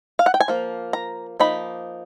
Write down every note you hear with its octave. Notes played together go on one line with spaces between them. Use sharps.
F5
F#5
G5
G#5
F3 A#3
A#5
F3 A#3 D#4 B5